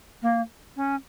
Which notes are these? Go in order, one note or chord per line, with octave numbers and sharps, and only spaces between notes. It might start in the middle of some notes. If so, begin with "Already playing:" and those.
A#3
C#4